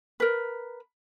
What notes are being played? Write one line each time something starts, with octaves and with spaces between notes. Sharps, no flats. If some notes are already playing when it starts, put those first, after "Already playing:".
A#4 B4